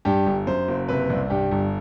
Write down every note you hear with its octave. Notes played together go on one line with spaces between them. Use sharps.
G2 G4
G1
F#2 C5
F#1
C3 B4
C2
G2 G4
G1